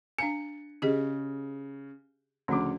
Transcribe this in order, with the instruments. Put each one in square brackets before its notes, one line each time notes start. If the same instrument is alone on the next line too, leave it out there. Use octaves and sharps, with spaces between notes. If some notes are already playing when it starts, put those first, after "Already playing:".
[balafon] D4 F5 G#5 [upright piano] C#7
[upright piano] C#3 [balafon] G4 G#4 D#5
[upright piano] D2 C#3 D6 [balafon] F3 D4